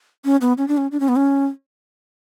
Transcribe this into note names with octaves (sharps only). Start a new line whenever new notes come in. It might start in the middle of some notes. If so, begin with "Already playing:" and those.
C#4
B3
C#4
D4
C#4
D4
C#4
B3
C#4